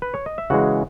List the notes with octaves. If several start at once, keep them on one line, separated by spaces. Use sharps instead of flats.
B4
C#5
D#5
E5
C#3 E3 G#3 F#4 F#5